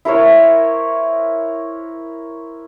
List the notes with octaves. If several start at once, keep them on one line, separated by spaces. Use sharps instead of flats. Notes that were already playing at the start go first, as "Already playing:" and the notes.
E4 A#4 C5 C#5